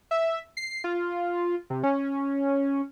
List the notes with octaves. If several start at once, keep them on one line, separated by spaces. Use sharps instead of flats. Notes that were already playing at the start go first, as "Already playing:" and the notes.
E5
C7
F4
C3
C#4